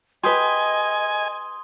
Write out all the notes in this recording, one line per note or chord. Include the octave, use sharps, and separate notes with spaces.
G4 B4 D#5 G#5 C6 D#6 G7